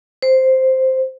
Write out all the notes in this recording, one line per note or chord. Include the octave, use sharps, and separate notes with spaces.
C5